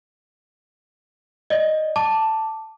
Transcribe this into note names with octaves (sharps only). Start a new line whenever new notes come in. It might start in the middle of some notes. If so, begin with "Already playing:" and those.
D5 D#5
A5 D6